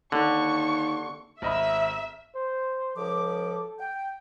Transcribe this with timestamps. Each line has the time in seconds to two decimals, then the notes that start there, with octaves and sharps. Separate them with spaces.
0.12 D#2 D3 C#6
1.42 G#1 D#5 E5 B5
2.35 C5
2.96 C#2 F3 A4 D6
3.78 G5